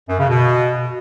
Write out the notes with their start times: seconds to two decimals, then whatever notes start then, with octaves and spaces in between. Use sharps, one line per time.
0.09 F#2
0.19 C#3
0.29 B2